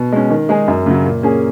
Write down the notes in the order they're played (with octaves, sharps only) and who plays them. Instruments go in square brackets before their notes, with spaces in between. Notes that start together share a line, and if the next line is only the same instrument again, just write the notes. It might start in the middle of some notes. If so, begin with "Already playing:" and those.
Already playing: [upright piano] B2
G#3 C#4
D#3
G#3 D#4 G#4
F#2
C#3 F#3
A#2
A#3 C#4 G#4